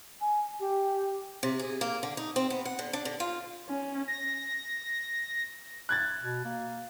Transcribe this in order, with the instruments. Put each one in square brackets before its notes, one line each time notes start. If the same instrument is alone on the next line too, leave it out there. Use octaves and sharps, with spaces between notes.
[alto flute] G#5
G4
[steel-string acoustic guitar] C3
G#4
A#3
D3
D#4
C4
B3
F#5
D3
D4
D3
F4
[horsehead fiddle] C#4
[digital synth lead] A#6
[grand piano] F#6 G#6 A6
[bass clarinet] B2
A#3